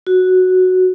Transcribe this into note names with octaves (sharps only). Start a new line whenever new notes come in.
F#4